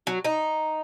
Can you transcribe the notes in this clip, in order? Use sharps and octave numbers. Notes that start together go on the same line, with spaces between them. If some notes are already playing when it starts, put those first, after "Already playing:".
F#3
D#4